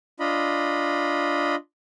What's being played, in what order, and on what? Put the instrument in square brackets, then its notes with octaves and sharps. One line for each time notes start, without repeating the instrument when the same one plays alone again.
[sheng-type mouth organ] D4 F4 D#5 B5